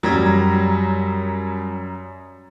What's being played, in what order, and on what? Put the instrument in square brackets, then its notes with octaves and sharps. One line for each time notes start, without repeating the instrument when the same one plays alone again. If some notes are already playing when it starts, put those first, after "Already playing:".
[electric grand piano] F#2 A#5 G#6 [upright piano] F#3 G3